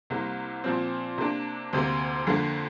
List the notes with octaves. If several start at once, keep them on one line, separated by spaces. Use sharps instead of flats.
C2 C3 A#3
A#2 F3 C4
C3 A#3 D4
D2 C3 A#3
F2 D3 A#3